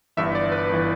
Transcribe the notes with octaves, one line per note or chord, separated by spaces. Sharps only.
G1 G2 E3 E5
D5
B4
G1 E3